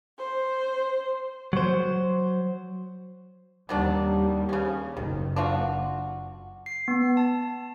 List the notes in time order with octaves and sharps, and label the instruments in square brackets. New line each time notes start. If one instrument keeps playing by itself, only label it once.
[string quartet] C5
[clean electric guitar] F#3 C5
[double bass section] D#2 G3 [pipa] D#3 F#3 D4
[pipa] C#3 C#4
[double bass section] F#1 [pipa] D#3
[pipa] D4 F4 F#4
[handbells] C7
B3
A5